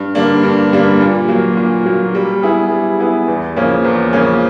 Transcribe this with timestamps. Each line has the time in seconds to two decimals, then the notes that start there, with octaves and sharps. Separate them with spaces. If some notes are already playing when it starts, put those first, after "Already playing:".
Already playing: G2
0.15 D3 G3 A#3 D4
0.43 G2
0.72 D3 G3 A#3 D4
1.00 A#2
1.28 F#3 A#3
1.57 A#2
1.85 F#3 A#3
2.15 G3
2.42 B3 E4 G#4
2.71 G3
2.99 B3 E4 G#4
3.28 E2
3.56 C#3 F3 A#3 C#4
3.85 E2
4.13 C#3 F3 A#3 C#4